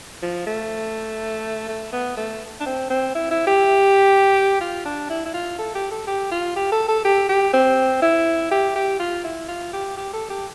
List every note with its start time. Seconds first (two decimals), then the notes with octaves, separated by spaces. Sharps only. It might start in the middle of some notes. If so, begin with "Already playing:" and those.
0.22 F3
0.47 A3
1.68 A3
1.93 B3
2.17 A3
2.61 D4
2.66 C4
2.90 C4
3.15 E4
3.31 E4
3.47 G4
4.61 F4
4.85 D4
5.10 E4
5.25 E4
5.34 F4
5.59 A4
5.75 G4
5.91 A4
6.07 G4
6.31 F4
6.56 G4
6.72 A4
6.88 A4
7.05 G4
7.29 G4
7.53 C4
8.02 E4
8.51 G4
8.76 G4
8.99 F4
9.24 E4
9.48 F4
9.73 G4
9.97 G4
10.13 A4
10.30 G4